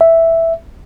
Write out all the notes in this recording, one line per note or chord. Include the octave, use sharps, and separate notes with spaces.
E5